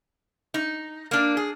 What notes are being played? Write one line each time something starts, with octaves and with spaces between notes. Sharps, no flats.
D#4
A#3 D4
G#4